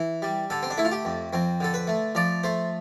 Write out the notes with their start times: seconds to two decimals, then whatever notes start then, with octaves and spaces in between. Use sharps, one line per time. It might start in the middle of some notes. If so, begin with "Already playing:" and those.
Already playing: E3
0.22 G3
0.50 D3 A4
0.63 C4
0.71 D4
0.77 A3 E4
0.85 F4
0.91 G4
1.05 F2
1.33 F2 C4
1.60 D3 A4
1.74 B4
1.87 A3
2.15 F3 D5
2.44 A3 C5